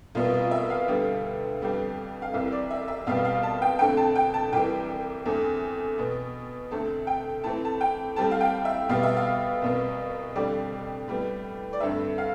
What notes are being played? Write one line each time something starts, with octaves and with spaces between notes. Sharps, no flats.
C2 B2 B3 F4
F4
E5
F5
D2 D3 G3 B3
F2 D3 G3 B3
F5
C2 C3 E3 E5
D5
E5
E5
C2 B2 G3 B3 F5
F5
A5
G5
F2 D3 A3 C4 G5
A5
G5
A5
C2 C3 E3 G5
E2 D3 A3 C4
B2 B3
D2 D3 A3 C4 A5
G5
A2 E3 A3 C4 A5
A5
G5
A2 G3 C4 A5
F5
G5
E5
B2 G3 B3 F5
E5
F5
C2 B2 B3
F2 D3 G3 C4 D5
A2 G3 B3
D5
G2 D3 A3 C4 E5
F5